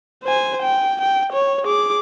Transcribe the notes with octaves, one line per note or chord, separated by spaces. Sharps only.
C5 G#5
G5
G5
C#5
G#4 D6